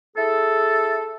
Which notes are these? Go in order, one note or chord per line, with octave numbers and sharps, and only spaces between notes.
E4 G#4 A4